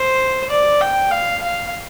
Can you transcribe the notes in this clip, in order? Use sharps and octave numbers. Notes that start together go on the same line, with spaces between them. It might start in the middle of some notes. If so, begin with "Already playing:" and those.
Already playing: C5
D5
G5
F5
F5